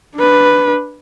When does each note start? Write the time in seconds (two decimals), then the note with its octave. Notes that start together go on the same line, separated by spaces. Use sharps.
0.16 D4 B4